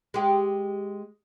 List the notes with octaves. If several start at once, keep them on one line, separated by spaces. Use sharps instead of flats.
G#3 G4